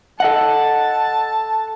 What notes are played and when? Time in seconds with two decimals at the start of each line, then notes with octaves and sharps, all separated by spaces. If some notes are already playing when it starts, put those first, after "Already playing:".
0.20 A4 D#5 F#5 A5